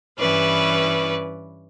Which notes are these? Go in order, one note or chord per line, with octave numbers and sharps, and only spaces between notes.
G2 E3 C#4 B4 D5